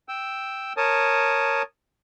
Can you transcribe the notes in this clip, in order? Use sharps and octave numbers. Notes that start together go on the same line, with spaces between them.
G5 E6
A#4 C#5 A5 D#6